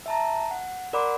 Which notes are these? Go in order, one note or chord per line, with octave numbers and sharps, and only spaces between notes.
E5 A5 A#5
F#5
A#4 D5 F#5 B5 C6 D6